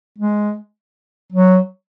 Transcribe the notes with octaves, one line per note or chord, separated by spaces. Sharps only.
G#3
F#3